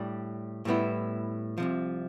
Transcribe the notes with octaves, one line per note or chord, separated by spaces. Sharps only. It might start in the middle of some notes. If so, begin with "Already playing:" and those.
Already playing: A2 G3 D4
A2 G3 B3 E4
C2 C3 F3